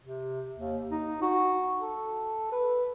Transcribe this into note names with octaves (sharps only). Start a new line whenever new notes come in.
C3
D#2
D#4
F#4
A4
B4